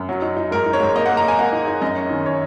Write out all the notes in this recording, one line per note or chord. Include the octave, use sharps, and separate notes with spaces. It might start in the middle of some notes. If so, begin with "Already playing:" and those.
Already playing: F#2
F#3
D#4
D#4
G#2 A#4
D#4
C#5
G#2
A#3 D#5
A#3 F#5
A#5
A#3 G#5
A#3 F#5
D#4
D#4
F#2 D#5
C#4
D#3
C#5